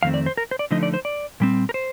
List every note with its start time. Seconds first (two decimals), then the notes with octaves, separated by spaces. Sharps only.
0.03 F2 D#3 A3 C4 F5
0.14 D5
0.26 C5
0.37 A#4
0.51 C5
0.59 D5
0.71 D3 F3 A3 D#4 D#5
0.83 D5
0.94 C5
1.05 D5
1.40 A#2 G3 C4
1.69 A#4
1.74 C5